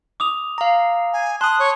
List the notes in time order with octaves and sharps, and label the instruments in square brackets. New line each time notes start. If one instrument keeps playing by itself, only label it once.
[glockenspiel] D6 D#6 F7
[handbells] F5 A#5
[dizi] G#5
[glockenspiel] A5 [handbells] C6 D#6 [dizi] F#6
[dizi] C#5